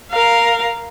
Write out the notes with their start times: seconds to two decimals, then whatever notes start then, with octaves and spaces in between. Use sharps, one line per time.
0.11 A#4 F5